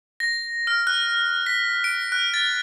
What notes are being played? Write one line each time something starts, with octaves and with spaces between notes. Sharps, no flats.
A#6
F6
F#6
B6
D7
F#6
A6